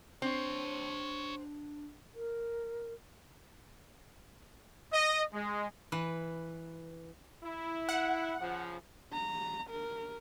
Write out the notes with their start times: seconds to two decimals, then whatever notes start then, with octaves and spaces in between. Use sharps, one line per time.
0.22 C4 D4 G4 C#5
2.14 A#4
4.93 D#5
5.33 G#3
5.92 E3 B4
7.43 E4
7.89 F#5
8.40 C#3 F3
9.13 A#5
9.70 A#4